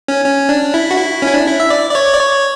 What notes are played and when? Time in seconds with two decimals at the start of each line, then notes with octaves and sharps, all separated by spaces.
0.08 C#4
0.25 C#4
0.49 D4
0.74 E4
0.91 F#4
0.97 E4
1.22 C#4
1.28 E4
1.34 D4
1.47 E4
1.60 E5
1.70 D5
1.90 D5
1.95 C#5
2.14 D5
2.20 C#5